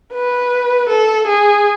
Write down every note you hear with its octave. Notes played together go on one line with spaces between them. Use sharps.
B4
A4
G#4